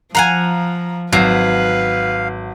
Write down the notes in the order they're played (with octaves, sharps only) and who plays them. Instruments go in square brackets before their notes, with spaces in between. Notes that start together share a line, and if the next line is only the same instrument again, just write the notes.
[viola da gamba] F3 [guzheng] F5 F#5 G#5 [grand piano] A#5
[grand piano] G#1 C7 [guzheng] F#3 [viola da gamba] B4 [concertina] F5